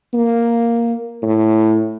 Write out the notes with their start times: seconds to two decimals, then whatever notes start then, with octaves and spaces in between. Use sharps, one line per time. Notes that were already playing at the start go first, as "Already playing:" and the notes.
0.13 A#3
1.23 A2